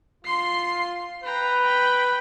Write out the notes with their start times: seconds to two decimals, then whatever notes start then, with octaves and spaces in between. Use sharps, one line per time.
0.25 F4 C6 C7
1.24 B4 G5 A#5
1.62 G5 B5